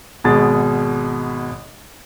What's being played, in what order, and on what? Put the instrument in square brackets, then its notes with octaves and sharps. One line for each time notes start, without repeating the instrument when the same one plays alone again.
[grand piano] G#1 B2 G#3 A6